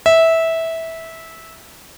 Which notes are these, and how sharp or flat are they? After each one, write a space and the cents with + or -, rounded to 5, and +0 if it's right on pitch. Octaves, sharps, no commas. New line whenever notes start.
E5 -15